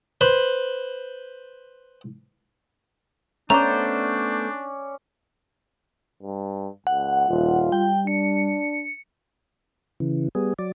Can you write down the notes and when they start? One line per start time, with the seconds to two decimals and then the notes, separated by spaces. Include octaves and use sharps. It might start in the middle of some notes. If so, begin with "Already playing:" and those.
0.21 B4 C5 B5
3.50 A3 B3 C#4 D4 C5 D5 A#5
6.23 G2
6.87 C#2 F#5
7.29 D#1 F4
7.72 G3 G5
8.07 D4 C#7
10.00 C#3 E3
10.35 G3 B3 G#4
10.59 F#3 D5